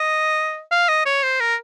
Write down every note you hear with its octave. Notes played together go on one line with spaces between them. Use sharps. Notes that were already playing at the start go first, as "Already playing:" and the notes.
Already playing: D#5
F5
D#5
C#5
C5
A#4